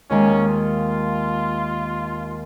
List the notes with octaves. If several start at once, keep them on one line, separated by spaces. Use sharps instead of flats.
D#2 D#3 G#3 C#4 D#4
F4